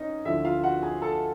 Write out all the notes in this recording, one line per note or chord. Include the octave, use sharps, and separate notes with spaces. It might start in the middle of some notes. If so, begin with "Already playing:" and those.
Already playing: C#4 D#4 D#5
D2 D3 F3 E4 E5
F4 F5
F#4 F#5
G#4 G#5
A4 A5